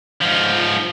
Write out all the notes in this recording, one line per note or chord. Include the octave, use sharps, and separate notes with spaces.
G#2 F3